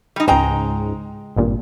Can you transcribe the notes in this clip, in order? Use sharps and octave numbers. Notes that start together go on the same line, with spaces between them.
G3 D#4
C#2 G#2 G#3 G5 A#5
G#1 G2 A#2